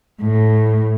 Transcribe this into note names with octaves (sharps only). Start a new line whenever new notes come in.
A2